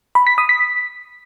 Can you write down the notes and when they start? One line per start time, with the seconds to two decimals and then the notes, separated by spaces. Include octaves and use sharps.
0.15 B5
0.27 B6
0.38 D#6
0.49 B6